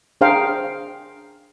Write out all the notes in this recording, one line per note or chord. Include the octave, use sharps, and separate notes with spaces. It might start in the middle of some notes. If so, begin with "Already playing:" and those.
D4 G#4 C5 F5 G5 A#5